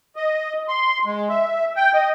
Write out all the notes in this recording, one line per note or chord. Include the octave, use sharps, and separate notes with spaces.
D#5
C6
G#3
E5
G5
D#5